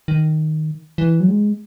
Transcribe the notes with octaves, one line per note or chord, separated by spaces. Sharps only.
D#3
E3
F#3
G#3